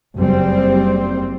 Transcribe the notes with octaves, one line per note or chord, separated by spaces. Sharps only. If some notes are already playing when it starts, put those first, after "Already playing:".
F#1 G3 C4